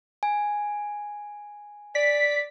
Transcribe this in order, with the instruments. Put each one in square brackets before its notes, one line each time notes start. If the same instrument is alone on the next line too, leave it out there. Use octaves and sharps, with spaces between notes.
[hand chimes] G#5
[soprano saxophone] D5 [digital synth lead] B6